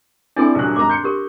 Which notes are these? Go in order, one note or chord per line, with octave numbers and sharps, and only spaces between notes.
C4 D4 E4 A4 D5 G#5
D#1 F#3 F#6
G#1 A#4 A#5 D6
C6 G6 C#7
G4 A#4